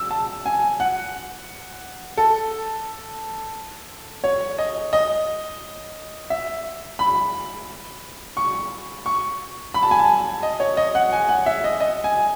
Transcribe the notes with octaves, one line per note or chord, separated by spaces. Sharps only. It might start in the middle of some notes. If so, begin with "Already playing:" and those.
Already playing: E6
A5
G#5
F#5
A4
C#5
D#5
D#5
E5
B5
C#6
C#6
B5
A5
G#5
A5
D#5
C#5
D#5
F#5
G#5
F#5
E5
D#5
D#5
G#5